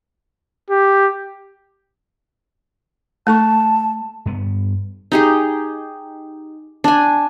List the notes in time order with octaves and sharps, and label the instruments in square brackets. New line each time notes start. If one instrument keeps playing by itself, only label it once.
[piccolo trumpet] G4
[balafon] A3 A4 C#6 [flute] A5
[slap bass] G2 B3
[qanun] D#4 G4 G#4
D4 G#5